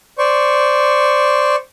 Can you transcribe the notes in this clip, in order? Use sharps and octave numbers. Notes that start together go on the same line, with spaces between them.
C5 D5 C#6